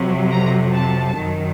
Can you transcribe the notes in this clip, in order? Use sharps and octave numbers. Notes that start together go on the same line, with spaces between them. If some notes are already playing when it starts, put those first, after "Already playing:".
Already playing: F2 C3 F#3
A#5
A5
F#2 D#3 F#3